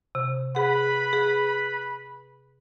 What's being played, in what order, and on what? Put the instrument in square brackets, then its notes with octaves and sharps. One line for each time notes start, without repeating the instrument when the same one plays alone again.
[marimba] C3
[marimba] G#4 F#5 [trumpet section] B4 B5
[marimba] G#4